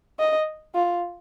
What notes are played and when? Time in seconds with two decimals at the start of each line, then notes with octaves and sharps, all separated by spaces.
0.19 D#5
0.75 F4